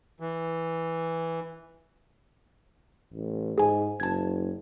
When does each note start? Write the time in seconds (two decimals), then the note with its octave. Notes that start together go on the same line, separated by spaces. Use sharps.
0.20 E3
3.13 A1
3.58 G#2 G#4 G#5
4.00 F#1 A5 G#6